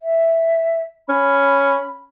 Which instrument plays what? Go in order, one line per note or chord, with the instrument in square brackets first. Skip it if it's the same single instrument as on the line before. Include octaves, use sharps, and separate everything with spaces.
[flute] E5
[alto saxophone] C#4 [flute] B5